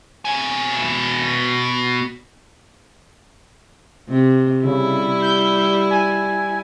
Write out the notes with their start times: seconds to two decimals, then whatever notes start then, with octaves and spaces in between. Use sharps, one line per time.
0.25 B2 G#5
4.09 C3
4.64 C#3 G3 E4
5.22 G6
5.90 G#5